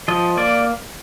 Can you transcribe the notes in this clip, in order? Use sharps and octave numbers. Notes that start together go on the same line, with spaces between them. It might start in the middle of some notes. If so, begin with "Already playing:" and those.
F3 D#5
A#3 D5